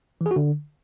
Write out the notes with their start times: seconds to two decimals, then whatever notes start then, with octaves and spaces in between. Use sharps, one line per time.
0.21 E3
0.26 G#4
0.31 F#4
0.36 D3